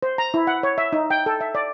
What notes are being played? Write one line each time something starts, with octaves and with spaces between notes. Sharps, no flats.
C5
A#5
E4
F#5
C#5
E5
D#4
G5
A4
E5
D5